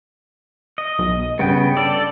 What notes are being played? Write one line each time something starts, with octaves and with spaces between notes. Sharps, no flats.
D#5
B1
G2 C#3 B3 G5
A4 D5